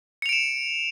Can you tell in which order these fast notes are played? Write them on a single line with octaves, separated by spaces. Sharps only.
C#7 F7 D7 E7